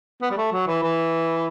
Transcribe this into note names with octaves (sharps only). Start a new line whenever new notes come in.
B3
G3
A3
F#3
E3
E3